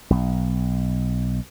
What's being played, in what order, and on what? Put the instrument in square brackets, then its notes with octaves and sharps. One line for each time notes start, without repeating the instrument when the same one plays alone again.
[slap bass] B1